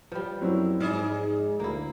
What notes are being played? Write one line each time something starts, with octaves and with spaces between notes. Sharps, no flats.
F3 G3 B4
F#2 F#3 C4 E4
G#2 D#4 G#4 D5 F6
D2 A#3 E4